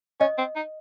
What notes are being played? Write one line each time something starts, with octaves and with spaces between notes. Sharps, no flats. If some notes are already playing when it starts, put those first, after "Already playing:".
C#4 D#5
C4
D#4